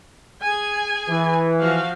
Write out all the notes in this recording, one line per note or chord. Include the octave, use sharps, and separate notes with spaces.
G#4 G#5
E3
F3 F#4 F5